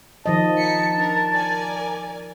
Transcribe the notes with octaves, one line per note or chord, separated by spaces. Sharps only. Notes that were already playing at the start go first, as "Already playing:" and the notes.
D#3 F3 D#5 A5
D#4 B6 C#7
D4 A#4
A#4 D5 G#5